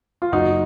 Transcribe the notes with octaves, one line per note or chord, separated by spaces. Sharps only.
F4
F#1 D#4 F#4